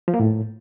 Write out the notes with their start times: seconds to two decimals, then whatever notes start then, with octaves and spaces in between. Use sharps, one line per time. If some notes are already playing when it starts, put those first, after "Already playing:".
0.08 F3
0.14 A#3
0.20 A2